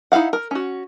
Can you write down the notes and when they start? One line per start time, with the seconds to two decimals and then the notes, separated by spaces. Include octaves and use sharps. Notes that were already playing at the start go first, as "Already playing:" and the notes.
0.12 D#4 E4 A4 F5 F#5
0.33 A#4
0.51 C#4 F#4